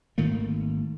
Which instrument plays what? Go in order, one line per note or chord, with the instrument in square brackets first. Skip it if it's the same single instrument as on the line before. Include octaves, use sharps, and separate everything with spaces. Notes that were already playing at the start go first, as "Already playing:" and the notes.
[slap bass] G#1 D#3 A3 A#3